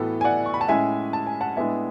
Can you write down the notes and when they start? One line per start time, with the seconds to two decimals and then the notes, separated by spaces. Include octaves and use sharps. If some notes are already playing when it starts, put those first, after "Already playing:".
Already playing: A2 E3 B3 F#4 A4
0.21 G#5
0.25 D5 F#5
0.46 C#6
0.54 B5
0.61 A5
0.68 A2 G#3 C#4 E5 G#5
1.13 A5
1.27 G#5
1.41 F#5 A5
1.56 A2 G#3 B3 D4 E5 G#5